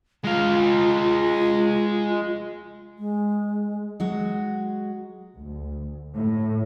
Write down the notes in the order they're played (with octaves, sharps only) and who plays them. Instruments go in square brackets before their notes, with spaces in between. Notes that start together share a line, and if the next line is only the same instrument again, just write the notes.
[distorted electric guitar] G#3 F5 [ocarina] F4
[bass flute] G#3
[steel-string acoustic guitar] F#3 G#3 F#4
[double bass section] D2
A2